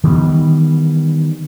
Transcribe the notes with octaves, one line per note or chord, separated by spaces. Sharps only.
D#3 E3 G3 B3